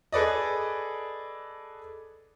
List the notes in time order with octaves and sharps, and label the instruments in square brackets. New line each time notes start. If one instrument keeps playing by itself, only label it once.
[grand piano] G#4 A4 B4 D5 D#5